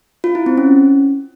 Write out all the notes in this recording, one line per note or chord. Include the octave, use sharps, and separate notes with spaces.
F4
E4
C4
C#4